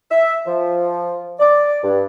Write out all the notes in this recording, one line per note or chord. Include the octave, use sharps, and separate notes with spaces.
E5
F3
D5
G2